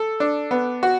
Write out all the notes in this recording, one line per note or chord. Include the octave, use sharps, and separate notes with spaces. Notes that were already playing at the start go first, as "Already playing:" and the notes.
Already playing: A4
D4
B3
F#4